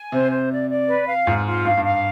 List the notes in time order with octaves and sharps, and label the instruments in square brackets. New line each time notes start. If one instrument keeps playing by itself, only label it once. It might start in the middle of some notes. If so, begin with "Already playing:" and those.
Already playing: [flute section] G#5
[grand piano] C3 [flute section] C5
[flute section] C5
D5
D5
B4
F5
[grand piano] G#2 [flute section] F4
[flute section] F4
[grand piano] G2 [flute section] F5
[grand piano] G2
[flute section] F5